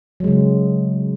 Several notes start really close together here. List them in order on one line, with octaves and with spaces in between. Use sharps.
F#3 G#3 C#3